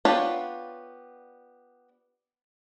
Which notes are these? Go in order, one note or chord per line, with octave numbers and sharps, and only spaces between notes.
B3 D4 F4 G4 C#5